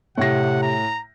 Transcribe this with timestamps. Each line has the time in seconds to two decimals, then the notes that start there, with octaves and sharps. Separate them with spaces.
0.18 A2 C3 F#5 A#6
0.62 A#5